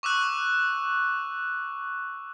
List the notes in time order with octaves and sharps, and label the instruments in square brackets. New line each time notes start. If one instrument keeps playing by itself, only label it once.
[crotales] C#6 D6 E6 F#6